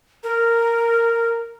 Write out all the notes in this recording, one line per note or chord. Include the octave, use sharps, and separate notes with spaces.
A#4